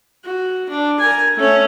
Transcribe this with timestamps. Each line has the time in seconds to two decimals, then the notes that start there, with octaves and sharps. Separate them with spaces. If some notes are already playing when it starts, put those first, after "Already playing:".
0.24 F#4
0.69 D4
0.99 A#4 G#5
1.36 A3 C#4